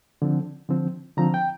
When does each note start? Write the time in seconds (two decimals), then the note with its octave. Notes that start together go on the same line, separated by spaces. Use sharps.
0.22 D3 F3 C4
0.69 D3 F3 C4
1.17 D3 F3 C4 A#5
1.34 G5